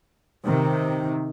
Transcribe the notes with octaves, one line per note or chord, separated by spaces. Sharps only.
C3 D#3